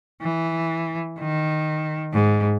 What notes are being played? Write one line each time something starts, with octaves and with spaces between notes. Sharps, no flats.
E3
D#3
G#2